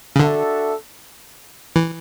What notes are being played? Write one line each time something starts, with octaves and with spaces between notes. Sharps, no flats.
C#3
D3 D4 F#4 A4 E5
E3